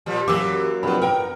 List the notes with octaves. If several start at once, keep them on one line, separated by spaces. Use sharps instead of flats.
A#2 F3 G3
F#2 E3 F#3 A#3 G4 D6 E6
G2 C3 F3 B4 F#5 B5
B3 A#4 G5